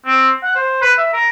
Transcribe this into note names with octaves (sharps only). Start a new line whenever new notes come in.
C4
F#5
C5
B4
E5
A#4